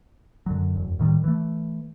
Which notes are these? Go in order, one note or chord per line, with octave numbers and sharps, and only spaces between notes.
F#2 D3 F#3
E1 F#2
A2 D#3 F#3 G3
E3 A3